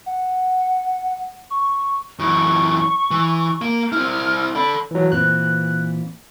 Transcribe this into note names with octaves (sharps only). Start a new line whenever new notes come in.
F#5
C#6
F#2 E3 C#6
E3
A#3
C4 E4 F6
A4 D5 B5
E3 F#3
A#2 E3 C4 F#6